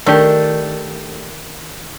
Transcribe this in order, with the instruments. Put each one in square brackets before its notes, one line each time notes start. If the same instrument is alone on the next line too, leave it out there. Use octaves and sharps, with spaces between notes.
[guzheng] D#3 [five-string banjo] A3 D4 G4